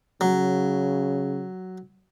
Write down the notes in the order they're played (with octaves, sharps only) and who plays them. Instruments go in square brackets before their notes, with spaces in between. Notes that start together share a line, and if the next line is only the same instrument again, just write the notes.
[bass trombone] C#3 [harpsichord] F#3